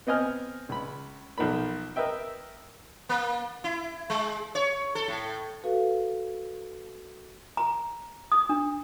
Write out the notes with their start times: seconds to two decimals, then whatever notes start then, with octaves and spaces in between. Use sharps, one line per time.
0.07 B3 C4 D#5 G#5 F6
0.69 C#2 B5
1.38 B1 F3 A#3 B5
1.96 A#4 B4 D#5 E5 G5
3.09 A#3
3.64 E4
4.10 G#3
4.55 C#5
4.95 A4
5.08 A2
5.64 F#4 A4 B4 F5
7.57 A#5
8.32 D#6
8.49 D4